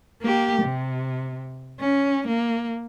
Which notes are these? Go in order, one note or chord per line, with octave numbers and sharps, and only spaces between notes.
A#3 G4
C3
C#4
A#3